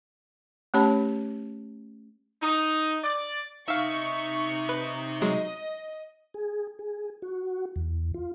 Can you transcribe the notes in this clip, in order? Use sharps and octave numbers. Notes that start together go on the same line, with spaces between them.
A3 C#4 G4 C#5 A5 B5
D#4
D5
C3 D#4 E5 F5 C#6 E6
B4
F#3 G#3 D#5
G#4
G#4
F#4
E2
F4